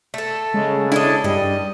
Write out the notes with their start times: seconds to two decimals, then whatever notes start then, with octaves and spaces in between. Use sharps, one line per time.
0.14 A3 A4
0.54 C#3 G#3
0.92 D4 E4 A4 D#5
1.24 G2 G3 D#5